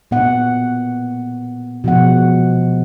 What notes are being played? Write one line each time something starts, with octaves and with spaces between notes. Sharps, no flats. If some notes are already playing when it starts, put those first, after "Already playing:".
A#2 B3 F#5
B2 F3 G#3 B3 F#5